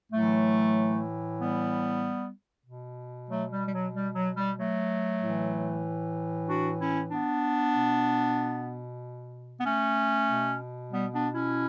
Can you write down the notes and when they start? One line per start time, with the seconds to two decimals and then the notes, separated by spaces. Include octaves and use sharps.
0.12 A2 E3 F#3 A3
1.39 G3 B3
2.67 B2
3.30 F#3 A3
3.51 G3
3.68 G3
3.72 F#3
3.94 G3
4.15 F#3
4.36 G3
4.57 F#3 A3
5.20 A2 E3
6.47 D4 F#4
6.79 C#4 E4
7.11 B3 D4
7.75 B2
9.60 B3
9.65 A3 C#4
10.29 B2
10.92 G3 B3
11.13 B3 D4
11.34 C#4 E4